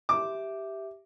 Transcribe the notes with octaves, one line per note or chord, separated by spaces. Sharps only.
G4 E5 D6